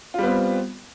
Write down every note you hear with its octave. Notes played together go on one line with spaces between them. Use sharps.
G3 B3 C4 F4